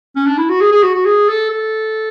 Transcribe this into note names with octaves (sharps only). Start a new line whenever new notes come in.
C#4
D4
E4
F#4
G#4
G#4
F#4
F#4
G#4
A4
A4